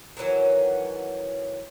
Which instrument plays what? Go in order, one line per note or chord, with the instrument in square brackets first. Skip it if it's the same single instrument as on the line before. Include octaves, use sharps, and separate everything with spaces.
[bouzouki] D#3 E3 F#3 C#4